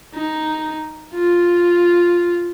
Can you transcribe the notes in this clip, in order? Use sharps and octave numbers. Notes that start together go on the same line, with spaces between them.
D#4
F4